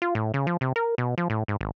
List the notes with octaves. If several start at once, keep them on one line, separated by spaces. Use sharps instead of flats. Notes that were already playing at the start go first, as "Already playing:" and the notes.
F4
A2
C#3
F3
C3
A#4
B2
F3
A2
G#2
G#1